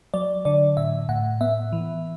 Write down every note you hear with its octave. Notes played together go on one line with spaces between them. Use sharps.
F#3 D5
D3 D5
A2 E5
A2 F#5
B3 E5
E3